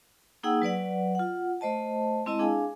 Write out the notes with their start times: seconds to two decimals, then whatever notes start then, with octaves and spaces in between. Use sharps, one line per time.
0.43 A#3 D#4 G#4 F#5 G5 E6
0.62 F#3 B4 D5 F#5
1.15 F4 F#5
1.61 A3 C5 D#5 A5
2.26 G#3 C4 E4 D#5 A5
2.39 D4 G#4 F5 G#5